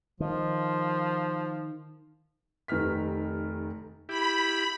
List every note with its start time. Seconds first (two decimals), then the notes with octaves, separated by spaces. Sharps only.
0.20 D#3 F3
2.68 F1 D#3 B4 F6 B6
4.09 E4 G4 B5